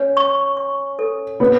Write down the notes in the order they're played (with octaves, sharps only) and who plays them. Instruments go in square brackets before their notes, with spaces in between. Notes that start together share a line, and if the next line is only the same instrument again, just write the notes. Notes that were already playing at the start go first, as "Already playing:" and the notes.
Already playing: [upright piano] C#4 [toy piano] C#5
[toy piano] C#6
C#6
A4
[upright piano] B3 [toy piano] C#5